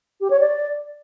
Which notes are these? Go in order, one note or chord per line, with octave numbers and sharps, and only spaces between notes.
G4
C#5
D5